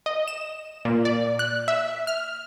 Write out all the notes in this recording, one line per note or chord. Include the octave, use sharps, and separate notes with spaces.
D#5
E7
A#2
D5
F#6
E5
F6